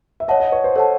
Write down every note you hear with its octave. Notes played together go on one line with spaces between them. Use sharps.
E5
C#5 D#5 F#5 A5
D#5
C#5
C5
A4 C#5 F#5 A5